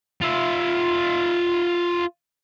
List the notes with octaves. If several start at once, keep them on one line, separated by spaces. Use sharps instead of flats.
F4 E5